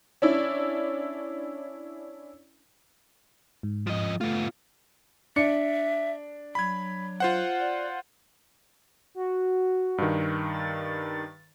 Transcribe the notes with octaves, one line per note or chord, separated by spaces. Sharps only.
C#4 D4 E4
G#2
F3 D#5
A3 B3 F4
D4 E5 C#7
F#3 B5 G#6
F4 C5 F#5
D5
F#4
G2 D#3
A6